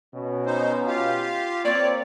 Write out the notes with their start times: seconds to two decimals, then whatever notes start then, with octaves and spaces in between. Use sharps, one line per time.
0.14 B2 C#4
0.46 D#4 C5
0.87 F4 G4 F5
1.65 A#3 C4 C#5 D5